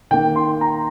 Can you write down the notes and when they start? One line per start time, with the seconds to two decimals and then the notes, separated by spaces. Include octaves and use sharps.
0.11 D#3 A#3 G5
0.36 C6
0.61 A#5